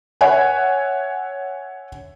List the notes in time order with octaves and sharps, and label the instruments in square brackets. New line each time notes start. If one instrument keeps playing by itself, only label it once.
[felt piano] C#5 E5 F#5 G#5